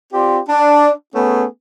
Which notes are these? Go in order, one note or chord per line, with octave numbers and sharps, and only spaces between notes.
C4 F4 G4 D5 C6
D4
A3 B3 C#4 G#4